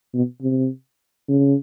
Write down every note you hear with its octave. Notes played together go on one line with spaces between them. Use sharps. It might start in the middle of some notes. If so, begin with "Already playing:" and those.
B2
C3
C#3